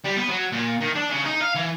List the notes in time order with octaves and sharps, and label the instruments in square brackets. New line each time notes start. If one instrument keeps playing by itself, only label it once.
[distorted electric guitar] G3
B3
F#3
A#2
D#3
D4
C#3
D#4
F5
E3